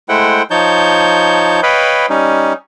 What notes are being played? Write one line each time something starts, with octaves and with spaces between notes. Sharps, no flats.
G#3 A3 E4 C5 F#5 G5
F3 D#4 C#5 A5 G6
B4 C#5 D#5 F5 G5 B5
G3 C#4 D#4